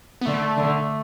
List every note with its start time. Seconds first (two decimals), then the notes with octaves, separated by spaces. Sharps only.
0.21 B3
0.26 D3 A3
0.57 D3